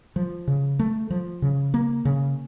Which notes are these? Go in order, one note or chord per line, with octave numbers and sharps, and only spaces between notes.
F3
C#3
A3
F3
C#3
A#3
C#3